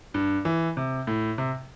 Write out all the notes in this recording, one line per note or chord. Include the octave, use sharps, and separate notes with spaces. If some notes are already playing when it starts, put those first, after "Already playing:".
G2
E3
C3
A2
C3